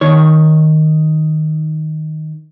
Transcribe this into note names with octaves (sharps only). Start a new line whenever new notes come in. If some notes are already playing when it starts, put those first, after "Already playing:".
D#3 C#5